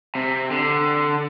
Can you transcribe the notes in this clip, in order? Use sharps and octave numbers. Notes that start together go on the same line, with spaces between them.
C3
D3